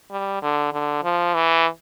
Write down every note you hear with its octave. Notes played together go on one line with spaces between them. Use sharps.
G3
D3
D3
F3
E3